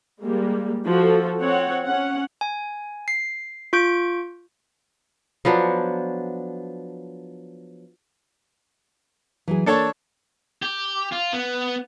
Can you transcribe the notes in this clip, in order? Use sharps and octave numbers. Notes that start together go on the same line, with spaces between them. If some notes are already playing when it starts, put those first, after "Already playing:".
G3 G#3 A#3
F3 F#4 A4
C4 C#5 F#5
C#4 F#5
G#5
C7
F4 C#6 G6 D7
F3 F#3 B3 D4
E3 F#3 G#4
A#3 D4 A4 C#5
G4
F4
B3